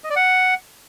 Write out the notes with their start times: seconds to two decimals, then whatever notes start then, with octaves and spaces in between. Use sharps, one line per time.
0.04 D#5
0.10 D5
0.16 F#5